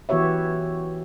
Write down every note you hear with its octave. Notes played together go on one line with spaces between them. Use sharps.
E3 B3 F#4 G4 C#5 E5